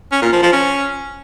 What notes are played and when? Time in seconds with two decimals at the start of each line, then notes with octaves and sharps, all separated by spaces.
0.12 C#4
0.22 A#2
0.32 F3
0.42 F3
0.53 C#4